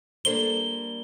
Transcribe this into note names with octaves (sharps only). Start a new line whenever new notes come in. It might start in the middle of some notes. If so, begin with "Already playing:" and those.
G3 A#3 D4 A4 C5 G7